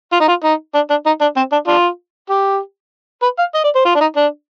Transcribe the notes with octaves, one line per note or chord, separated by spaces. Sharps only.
F4
D#4
F4
D#4
D4
D4
D#4
D4
C4
D4
D4 F4
G4
B4
F5
D#5
D5
C5
F4
D4
D#4
D4